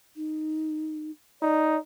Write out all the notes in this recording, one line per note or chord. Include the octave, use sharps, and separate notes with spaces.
D#4
D#4 D5